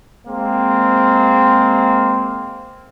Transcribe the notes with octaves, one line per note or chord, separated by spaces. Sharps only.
G#3 A#3 C4